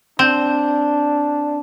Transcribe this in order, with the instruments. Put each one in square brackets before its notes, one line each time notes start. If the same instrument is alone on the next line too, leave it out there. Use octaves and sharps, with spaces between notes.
[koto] C4 [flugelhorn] D4